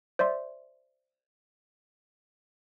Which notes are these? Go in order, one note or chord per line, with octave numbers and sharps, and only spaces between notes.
C5 D5 E5 C6